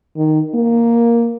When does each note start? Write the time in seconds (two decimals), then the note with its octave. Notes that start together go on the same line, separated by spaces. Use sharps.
0.17 D#3
0.55 A#3